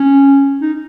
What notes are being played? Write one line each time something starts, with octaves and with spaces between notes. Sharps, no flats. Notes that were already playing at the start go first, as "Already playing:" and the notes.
Already playing: C#4
D#4